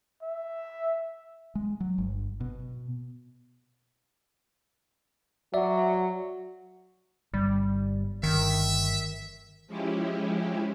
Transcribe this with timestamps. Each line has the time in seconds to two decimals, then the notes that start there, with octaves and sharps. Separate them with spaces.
0.22 E5
1.55 G#3
1.80 F#3
1.98 G1
2.41 B2
5.54 F#3 D5 E5
7.34 G1 G3
8.23 G1 D#3 E5
9.67 F3 G#3 C#4 E4 G4